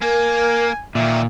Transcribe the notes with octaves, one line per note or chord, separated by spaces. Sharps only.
A#3 A#4 G#5
A#2 D3 D#3 E5